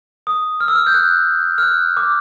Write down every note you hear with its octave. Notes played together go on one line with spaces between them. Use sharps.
D#6
F6
E6
F6
G6
F#6
F6
F#6
D6